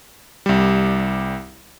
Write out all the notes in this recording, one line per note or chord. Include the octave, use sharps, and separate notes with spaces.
C2 G3